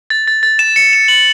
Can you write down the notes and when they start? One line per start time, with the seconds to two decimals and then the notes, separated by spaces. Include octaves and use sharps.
0.10 A6
0.28 A6
0.43 A6
0.59 E7
0.76 C#7
0.93 E7
1.08 F#7